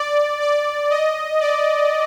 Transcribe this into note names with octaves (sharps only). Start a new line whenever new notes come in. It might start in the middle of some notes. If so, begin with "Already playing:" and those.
Already playing: D5
D5
D#5
D5